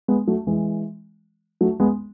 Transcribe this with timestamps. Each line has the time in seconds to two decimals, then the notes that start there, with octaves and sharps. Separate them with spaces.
0.08 G#3 B3
0.27 F#3 A3
0.47 E3 G#3
1.61 F#3 A3
1.80 G#3 B3